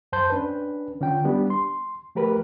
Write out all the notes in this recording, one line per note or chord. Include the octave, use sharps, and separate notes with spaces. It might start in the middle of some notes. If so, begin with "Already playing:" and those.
F#2 C5 A5 C6 G6
C#4 D4 B4
D3 C#4 F4 G5
G3 B3 D4 G4
C6
F3 A3 G4 A#4 B4